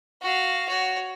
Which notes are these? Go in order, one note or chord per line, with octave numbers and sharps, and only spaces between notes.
F#4 F5
F#4 C#5